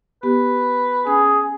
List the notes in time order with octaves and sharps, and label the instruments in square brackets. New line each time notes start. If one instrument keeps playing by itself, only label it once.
[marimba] B3 G4 [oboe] B4
[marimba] C#4 [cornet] G#4